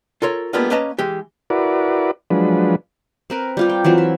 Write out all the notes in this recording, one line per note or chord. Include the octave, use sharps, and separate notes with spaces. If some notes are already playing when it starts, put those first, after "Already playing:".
F4 A4 A#4 C#5
G3 G#3 A#3 B3 D4 F4
A#3 C#4 B4 D#5 A5 A#5
E3 G#3 G4
E4 F#4 A#4 B4 D5
F3 F#3 G#3 D4 B4
C4 A#4 B4
G3 F4 G4
G5
E3 F#3 C4 F4
E5